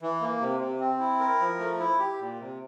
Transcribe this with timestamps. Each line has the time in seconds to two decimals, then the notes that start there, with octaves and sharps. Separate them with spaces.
0.02 E3
0.21 A#3
0.41 C3
0.60 C3
0.80 C4
1.00 E4
1.20 A#4
1.40 F3
1.59 A3
1.79 E4
1.99 G4
2.19 A#2
2.39 C3